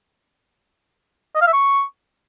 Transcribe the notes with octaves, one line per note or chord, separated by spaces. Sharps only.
D#5
F5
E5
C#6